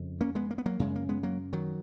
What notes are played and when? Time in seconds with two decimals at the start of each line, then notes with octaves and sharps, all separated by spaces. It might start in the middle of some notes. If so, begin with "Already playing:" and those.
Already playing: F2 C#3
0.21 A#3 C#4
0.35 G#3 B3
0.51 A#3
0.58 B3
0.66 F#3 A#3
0.79 F#2 C#3 G#3
0.96 A#3
1.09 G#3 B3
1.23 F#3 A#3
1.53 D#3 F#3